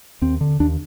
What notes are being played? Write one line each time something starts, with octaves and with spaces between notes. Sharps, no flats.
D#2 C4
D3
D#2 D4